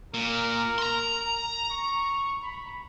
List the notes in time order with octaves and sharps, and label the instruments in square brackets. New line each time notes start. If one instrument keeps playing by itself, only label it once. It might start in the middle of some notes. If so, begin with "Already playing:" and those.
[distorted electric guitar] A#2 [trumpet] A#4
[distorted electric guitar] A#5 C6
[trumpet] C#6
B5